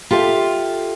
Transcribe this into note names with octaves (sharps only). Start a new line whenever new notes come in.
F4 G4 A4 E5